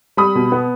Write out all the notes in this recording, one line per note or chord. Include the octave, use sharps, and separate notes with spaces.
G3 B5 D#6
B2
B3